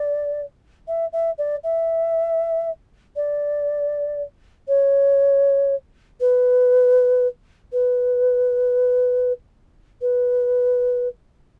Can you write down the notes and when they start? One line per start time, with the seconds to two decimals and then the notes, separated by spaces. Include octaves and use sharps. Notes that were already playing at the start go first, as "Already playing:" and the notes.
Already playing: D5
0.87 E5
1.12 E5
1.38 D5
1.63 E5
3.16 D5
4.68 C#5
6.20 B4
7.72 B4
10.01 B4